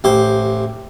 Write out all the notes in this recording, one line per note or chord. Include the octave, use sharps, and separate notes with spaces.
A1 G4 C5